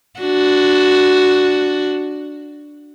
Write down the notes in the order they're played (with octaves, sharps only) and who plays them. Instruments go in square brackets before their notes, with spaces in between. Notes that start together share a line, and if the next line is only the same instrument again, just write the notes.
[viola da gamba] D4 F#4